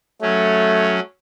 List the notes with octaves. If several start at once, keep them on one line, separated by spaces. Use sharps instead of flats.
F#3 A3 C#4